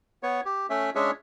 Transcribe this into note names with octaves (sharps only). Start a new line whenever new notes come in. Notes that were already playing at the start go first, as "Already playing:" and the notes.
B3 C#5
G4
A3 C#4 E5
G#3 C#4 D4 G#4 C#5 E5